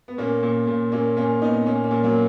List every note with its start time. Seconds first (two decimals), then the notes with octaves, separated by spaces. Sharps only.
0.08 B3
0.18 A#2 A#3 C#4
0.43 A#2
0.67 A#2
0.92 A#2 A#3 C#4
1.17 A#2 A#3 C#4
1.41 A#2 B3 D#4
1.66 A#2 A#3 C#4
1.84 A#3 C#4
1.91 A#2
2.03 F#3 A#3